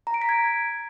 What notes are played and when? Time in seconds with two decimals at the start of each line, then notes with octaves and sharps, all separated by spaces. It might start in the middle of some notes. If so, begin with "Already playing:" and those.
0.07 A#5
0.14 D7
0.22 B6
0.29 G#6